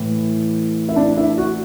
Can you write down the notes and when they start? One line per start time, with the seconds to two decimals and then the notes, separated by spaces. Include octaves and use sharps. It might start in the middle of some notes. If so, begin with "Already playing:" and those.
Already playing: A2 E3
0.89 E4
0.96 D4
1.17 E4
1.38 F#4